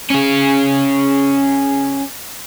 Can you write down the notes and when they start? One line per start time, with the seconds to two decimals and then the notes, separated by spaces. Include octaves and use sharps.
0.10 C#4 G#4